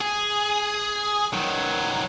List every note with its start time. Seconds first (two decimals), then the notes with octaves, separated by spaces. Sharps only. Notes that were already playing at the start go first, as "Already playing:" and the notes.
0.01 G#4
1.33 D#3 F#3